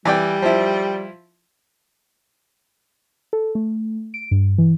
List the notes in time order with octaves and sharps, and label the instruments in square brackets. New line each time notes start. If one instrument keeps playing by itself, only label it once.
[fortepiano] E3 D5 G5 [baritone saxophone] G3
[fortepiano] F3 E4
[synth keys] A4
A3
D7
G2
E3